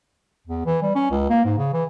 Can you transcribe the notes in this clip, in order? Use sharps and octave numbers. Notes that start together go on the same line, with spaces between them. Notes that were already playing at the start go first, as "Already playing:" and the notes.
E2
E3
G3
C#4
C#2
A#3
G#2
C#3
E3